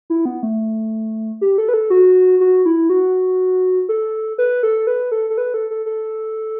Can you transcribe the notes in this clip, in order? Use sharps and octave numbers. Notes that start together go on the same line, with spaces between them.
E4
B3
A3
G4
A4
B4
A4
F#4
F#4
E4
F#4
A4
B4
A4
B4
A4
A4
B4
A4
A4
A4